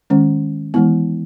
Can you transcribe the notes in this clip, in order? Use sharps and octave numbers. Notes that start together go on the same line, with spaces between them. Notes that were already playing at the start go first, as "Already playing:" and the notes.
D#3 G#3 C#4
E3 G#3 B3 E4